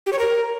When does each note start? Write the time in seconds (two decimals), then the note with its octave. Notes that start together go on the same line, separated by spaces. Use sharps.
0.06 G4
0.13 C#5
0.19 A#4